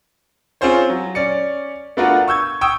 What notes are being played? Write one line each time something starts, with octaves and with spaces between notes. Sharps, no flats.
C4 C#4 F4 G#4 C5 C#5
F#3
C#4 D5 C#7
A3 B3 D4 F4 F#4 A#4
C#6 E6 G6 G#6
G5 C#6 D#6 E6